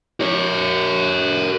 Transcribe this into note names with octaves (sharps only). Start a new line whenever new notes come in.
A#4 C#5